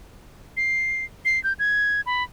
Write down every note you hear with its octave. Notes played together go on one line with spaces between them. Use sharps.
C7
C7
G6
G#6
B5